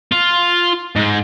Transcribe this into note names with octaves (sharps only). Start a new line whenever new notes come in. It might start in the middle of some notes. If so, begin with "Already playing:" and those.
F4
G#2 G#3